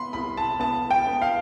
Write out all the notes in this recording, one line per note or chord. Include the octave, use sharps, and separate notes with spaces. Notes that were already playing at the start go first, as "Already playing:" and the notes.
Already playing: B3 B5 C6
C2 B5
A5
B3 A5
G5
B3
F5